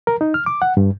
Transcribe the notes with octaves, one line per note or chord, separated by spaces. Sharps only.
A#4
D#4
F6
D6
F#5
G2